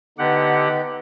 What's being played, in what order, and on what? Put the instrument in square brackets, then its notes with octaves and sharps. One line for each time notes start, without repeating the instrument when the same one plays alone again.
[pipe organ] D3 G4 F#5 [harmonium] B3 D#4